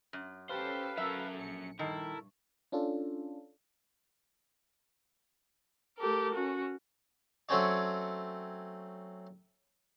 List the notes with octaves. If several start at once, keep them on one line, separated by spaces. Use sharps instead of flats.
F#2
C#4 G4 A4 B4 C5 F5
F#3 C#4 F#4 A4 A#4 E5
A#1 C#7
G2 D#3 E4 A4 A#4
C#4 D4 F4 A4
A3 G4 A4 A#4
C#4 F#4
F#3 A3 C4 C#4 C#5 D5